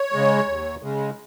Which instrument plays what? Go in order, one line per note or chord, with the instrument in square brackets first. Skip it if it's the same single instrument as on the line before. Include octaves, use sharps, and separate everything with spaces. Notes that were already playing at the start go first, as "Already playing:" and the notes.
Already playing: [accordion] C#5
C#3 G#3
D#2
C#3 G#3